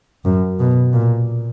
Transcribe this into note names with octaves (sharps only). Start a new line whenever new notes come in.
F#2
B2
A#2